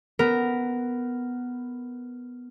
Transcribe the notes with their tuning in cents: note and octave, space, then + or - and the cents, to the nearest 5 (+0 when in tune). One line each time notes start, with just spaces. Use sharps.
B3 +5 A#4 -5